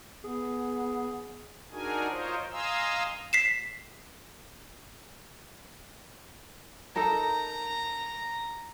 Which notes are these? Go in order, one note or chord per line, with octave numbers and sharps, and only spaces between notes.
B3 G#4
D4 D#4 F#4 G#4 A#4 G#5
F4 A#4 C5 C#5 D#5
D#5 F5 G#5 A#5 C6 E6
B6 C7 E7
D#4 A4 A#4 A#5